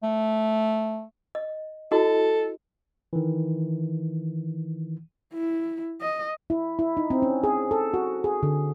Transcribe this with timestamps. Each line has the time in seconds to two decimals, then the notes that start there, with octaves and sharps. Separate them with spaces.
0.03 A3
1.35 D#5
1.92 E4 F#4 A4 D#5
3.13 D#3 E3
5.34 E4
6.01 D#5
6.50 E4
6.79 E4
6.97 D#4
7.10 C4
7.22 C#4
7.44 G#4
7.71 A4
7.94 F#4
8.24 G#4
8.43 D3